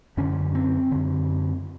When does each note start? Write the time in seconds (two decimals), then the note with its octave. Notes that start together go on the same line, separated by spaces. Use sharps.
0.17 F#2 D3 C#4
0.55 C4
0.91 F#2 D3